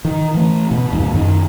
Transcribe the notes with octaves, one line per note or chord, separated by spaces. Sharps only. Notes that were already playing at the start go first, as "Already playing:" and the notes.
D#3
E3 A3
B2
D#1 G#1 G2 A#3
F#2 D#3